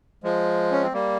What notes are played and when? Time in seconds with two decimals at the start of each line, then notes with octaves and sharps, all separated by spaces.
0.24 F3 G#3
0.72 C#4
0.83 C4
0.93 G3 A#3